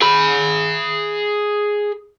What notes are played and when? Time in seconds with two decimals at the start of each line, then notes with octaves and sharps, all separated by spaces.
0.02 G#4 B5